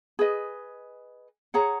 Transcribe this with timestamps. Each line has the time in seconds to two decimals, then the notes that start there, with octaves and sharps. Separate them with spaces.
0.19 G#4 B4 D#5
1.54 G#4 C#5 F#5 A#5